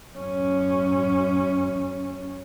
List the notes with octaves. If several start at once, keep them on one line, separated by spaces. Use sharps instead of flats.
F#2 C#4